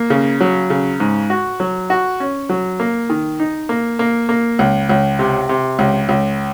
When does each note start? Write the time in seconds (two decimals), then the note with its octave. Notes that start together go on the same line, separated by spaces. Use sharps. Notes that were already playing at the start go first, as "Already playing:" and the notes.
Already playing: A#3
0.10 C#3
0.40 F#3
0.70 C#3
1.00 G#2
1.30 F#4
1.60 F#3
1.90 F#4
2.20 C#4
2.49 F#3
2.80 A#3
3.10 D#3
3.40 D#4
3.69 A#3
3.99 A#3
4.29 A#3
4.59 C#2
4.89 C#2
5.19 C3
5.49 C3
5.79 C#2
6.09 C#2